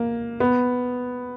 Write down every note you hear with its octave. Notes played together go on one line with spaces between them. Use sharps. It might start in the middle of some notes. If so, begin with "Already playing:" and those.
Already playing: A#3
B3